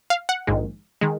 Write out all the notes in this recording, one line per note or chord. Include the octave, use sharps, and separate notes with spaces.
F5
F#5
A#1 G#2 D#3 G#3
D#3 G#3